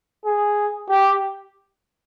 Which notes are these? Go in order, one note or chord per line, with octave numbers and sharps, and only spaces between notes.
G#4
G4